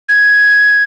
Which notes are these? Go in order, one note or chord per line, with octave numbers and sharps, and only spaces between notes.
G#6